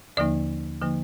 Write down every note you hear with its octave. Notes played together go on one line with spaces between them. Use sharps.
D#2 D3 F3 A#3 D#4 D5
D3 F3 A#3 D#4